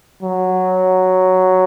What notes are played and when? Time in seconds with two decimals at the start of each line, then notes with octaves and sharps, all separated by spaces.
0.23 F#3